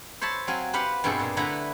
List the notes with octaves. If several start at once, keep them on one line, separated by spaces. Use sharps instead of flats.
C5 C#5 E5 A5 B5
F#3 C4 F5 G#5
G4 B4 C5 F5 F#5
G2 B2 C4 G#4 A4 G#5
A#2
D3 A3 E4 B4 A#5 B5